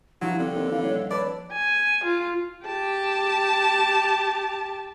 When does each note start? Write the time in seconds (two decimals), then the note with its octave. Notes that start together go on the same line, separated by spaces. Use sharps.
0.21 G2 F3 F#3 E4
0.39 C2 D3 C4
0.55 D#2
0.71 E3 F5
0.83 D#1 C#5
1.11 A4 B4 C#5 D5
1.53 G#5
2.04 F4
2.66 G4 A5